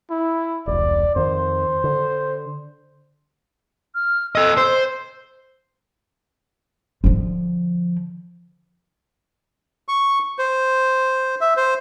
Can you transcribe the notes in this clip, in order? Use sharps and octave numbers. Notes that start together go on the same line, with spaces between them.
E4
E1 C2 D5
F2 D#3 C5
D3
F6
A4 D#5 E6
C5
D3 F3
C#6
C5
E5
C5